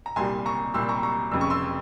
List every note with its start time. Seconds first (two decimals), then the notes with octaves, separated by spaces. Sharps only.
0.06 A#5
0.16 C2 A#2 G3 G#5 C6
0.46 A#5 C#6
0.74 C2 A#2 G3 C6 E6
0.89 A#5 C#6
1.03 A#5 C#6
1.31 F1 F2 C#3 E6
1.41 C#6
1.50 C6 E6